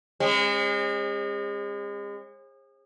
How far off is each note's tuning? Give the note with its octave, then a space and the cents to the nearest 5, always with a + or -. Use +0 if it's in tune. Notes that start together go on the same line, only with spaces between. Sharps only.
G#3 -35 C4 +45